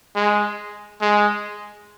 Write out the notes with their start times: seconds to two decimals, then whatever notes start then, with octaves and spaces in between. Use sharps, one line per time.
0.16 G#3
1.01 G#3